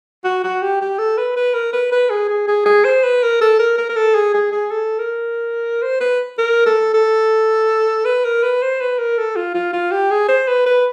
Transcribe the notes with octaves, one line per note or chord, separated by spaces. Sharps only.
F#4
F#4
G4
G4
A4
B4
B4
A#4
B4
B4
G#4
G#4
G#4
G#4
C5
B4
A#4
A4
A#4
A#4
A#4
A4
G#4
G#4
G#4
A4
A#4
C5
B4
A#4
A4
A4
B4
A#4
B4
C5
B4
A#4
A4
F4
F4
F4
G4
G#4
C5
B4
B4